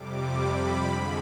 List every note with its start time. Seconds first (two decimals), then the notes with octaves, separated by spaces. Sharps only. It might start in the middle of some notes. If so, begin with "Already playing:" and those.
Already playing: F2 C3 G3 D6
0.39 B5
0.86 F2 D3 G#3